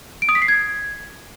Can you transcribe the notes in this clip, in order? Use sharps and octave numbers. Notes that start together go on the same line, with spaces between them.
D7
D#6
B6
C7
G#6